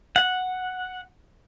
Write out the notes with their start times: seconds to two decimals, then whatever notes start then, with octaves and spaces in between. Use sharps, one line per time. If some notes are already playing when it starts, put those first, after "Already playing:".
0.16 F#5